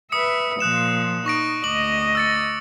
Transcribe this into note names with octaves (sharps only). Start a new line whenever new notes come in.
B4 E5 D#6 C#7
A#2 F3 D#6 F#6 E7
D#4 C#6 A#6 D7
D2 D#5 D6 F#7
E6 A6 C#7